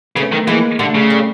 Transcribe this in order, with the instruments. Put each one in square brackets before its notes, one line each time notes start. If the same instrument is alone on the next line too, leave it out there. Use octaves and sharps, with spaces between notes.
[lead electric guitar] C#3 [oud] A3 B3
[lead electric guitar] D#3
[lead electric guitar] E3 [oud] G#3 A#3
[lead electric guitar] D3 [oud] G3 A3
[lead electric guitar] C#3
[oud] G3 A3